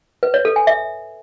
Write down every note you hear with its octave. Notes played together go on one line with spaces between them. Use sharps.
B4
C#5
A4
G#5
E5